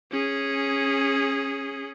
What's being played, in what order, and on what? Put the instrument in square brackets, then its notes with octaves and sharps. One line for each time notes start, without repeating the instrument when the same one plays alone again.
[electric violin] C#4 G#4